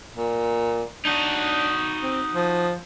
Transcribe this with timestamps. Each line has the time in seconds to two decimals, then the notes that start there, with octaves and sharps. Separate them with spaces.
0.15 A#2
1.05 D4 D#4 F#4
2.03 C4
2.34 F3